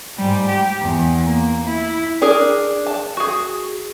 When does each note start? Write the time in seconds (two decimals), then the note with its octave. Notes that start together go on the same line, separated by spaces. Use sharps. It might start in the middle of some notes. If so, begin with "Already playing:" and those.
0.18 G#2 G3
0.48 G4
0.81 E2
1.26 A#3
1.65 E4
2.22 D4 G#4 A#4
2.86 A5
3.17 F#4 G#4